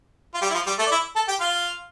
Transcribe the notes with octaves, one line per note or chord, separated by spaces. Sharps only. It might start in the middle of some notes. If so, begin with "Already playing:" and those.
F4
G3 G4
E4
F3 F4
G3 G4
A3 A4
D5
E4 E5
A4 A5
G4 G5
F4 F5